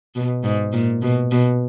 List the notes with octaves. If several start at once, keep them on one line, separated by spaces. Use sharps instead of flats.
B2
G#2
A#2
B2
B2